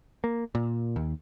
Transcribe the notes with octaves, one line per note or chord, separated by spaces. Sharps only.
A#3
A#2
D#2